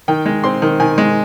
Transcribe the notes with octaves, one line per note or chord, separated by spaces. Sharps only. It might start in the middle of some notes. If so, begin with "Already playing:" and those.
D#3 G5
G#3
C4 C6
D#3
D#3 G#5
G#3